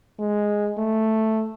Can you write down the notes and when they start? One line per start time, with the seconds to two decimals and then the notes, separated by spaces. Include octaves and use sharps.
0.19 G#3
0.78 A3